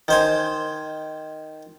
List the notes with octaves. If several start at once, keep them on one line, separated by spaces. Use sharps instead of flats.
D#3 C5 G#5